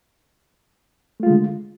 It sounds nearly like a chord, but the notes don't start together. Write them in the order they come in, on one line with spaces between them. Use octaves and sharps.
A3 F4 G#3 D3